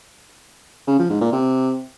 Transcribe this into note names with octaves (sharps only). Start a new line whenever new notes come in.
C#3
F3
G#2
A#2
C3